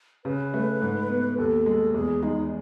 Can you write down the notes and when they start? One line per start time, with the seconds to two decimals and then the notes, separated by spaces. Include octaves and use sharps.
0.25 C#3 B4
0.54 A3
0.82 G#2
1.10 B3
1.38 D#2 A4
1.66 G#3
1.94 E2 G#4
2.23 G#3 D#4